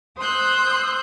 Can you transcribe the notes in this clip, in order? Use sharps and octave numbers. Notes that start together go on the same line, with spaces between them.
C5 C6 D#6 E6 F#6 G6